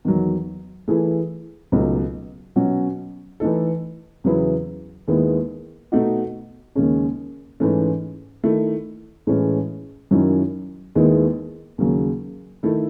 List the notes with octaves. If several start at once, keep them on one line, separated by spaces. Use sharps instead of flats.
E2 D#3 F#3
E3 A3 E4 G#4
C#2 B2 F#3 A3 D#4
B2 F#3 C#4 F#4
E3 A3 D#4 A4
E2 C#3 F#3 B3 E4
D#2 D#3 G#3 B3 E4
B2 A3 D#4 F#4
D#2 C#3 G#3 C#4
G#2 E3 A3 C#4
D#3 A3 E4
A2 E3 G#3 C#4
F#2 D#3 F#3 C#4 E4
D#2 D#3 G#3 B3 E4
D#2 C#3 F#3
D#3 A3 E4 A4